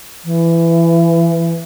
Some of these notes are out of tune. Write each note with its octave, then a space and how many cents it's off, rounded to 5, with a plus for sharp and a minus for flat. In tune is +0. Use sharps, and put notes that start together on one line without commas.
E3 +20